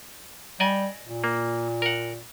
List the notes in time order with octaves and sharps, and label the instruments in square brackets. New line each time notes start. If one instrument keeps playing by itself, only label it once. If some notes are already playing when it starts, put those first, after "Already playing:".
[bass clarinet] G3 [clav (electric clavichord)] D5 D#5 G#5
[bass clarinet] A#2
[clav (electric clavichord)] A#3
A#4 F#5